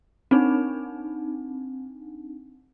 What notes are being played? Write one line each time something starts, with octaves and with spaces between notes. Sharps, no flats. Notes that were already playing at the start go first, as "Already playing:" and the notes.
C4 D4 D#4